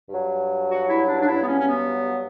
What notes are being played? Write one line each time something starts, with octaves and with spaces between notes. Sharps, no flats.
G2 F#3
F#4
E4
D4
D4
G2 F#3 E4
B3
C#4
C#4
B3